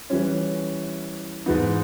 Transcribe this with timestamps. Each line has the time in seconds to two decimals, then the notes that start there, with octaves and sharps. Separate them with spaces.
0.10 E3 G3 C#4
1.46 G#2 E3 G#3 B3 D#4